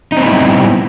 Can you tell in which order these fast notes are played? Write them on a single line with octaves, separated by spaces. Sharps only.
D#4 C4 B3 E4 G3